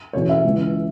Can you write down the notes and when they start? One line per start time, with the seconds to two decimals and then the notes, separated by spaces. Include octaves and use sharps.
0.13 E2 B2 A3 C#4 C#5
0.29 E5
0.44 C#2 C#3 E3